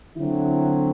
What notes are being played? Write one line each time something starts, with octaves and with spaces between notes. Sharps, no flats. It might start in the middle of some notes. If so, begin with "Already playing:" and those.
D3 F#3 C4 E4